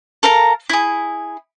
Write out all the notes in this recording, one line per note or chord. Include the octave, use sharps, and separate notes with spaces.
A4 A#4 F5 A#5
E4 G#4